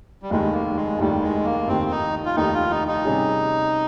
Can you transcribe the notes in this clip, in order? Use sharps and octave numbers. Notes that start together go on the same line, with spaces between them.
G3
F1 D#2 D#3 G#3
A#3
G#3
F1 D#2 D#3 G3
G#3
A#3
F1 D#2 D#3 C4
D#4
F4
F1 D#2 D#3 D#4
F4
D#4
D#4
C3 G3 C#4 G#4